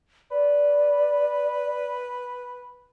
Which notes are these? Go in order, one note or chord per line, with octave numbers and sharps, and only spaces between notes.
B4 D5